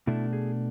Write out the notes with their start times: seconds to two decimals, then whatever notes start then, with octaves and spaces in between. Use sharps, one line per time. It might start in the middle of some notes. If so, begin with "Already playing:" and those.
0.07 B2 A3 D4 E4
0.33 G#4